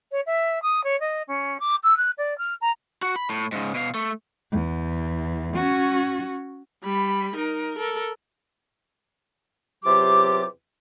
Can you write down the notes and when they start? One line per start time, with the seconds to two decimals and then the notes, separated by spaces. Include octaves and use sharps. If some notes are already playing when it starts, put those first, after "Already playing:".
0.12 C#5
0.26 E5
0.62 D#6
0.84 C#5
1.00 D#5
1.28 C#4
1.60 D6
1.84 E6
1.97 F#6
2.18 D5
2.38 F6
2.61 A#5
3.02 F#4
3.16 B5
3.30 A2
3.52 G#2 C#3
3.74 B2 F5
3.95 A3
4.52 E2
5.55 C#4 F#4
6.84 G3 B5
7.35 D#4 A#4
7.79 A4 A#4
9.84 E2 C3 F#3 F4 G4 D6